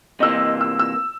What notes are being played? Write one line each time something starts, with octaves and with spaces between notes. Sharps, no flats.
C3 E3 A#3 D#5 E6
E6
E6